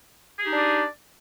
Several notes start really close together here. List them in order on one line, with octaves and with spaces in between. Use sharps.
G#4 G4 D#4 D4 D5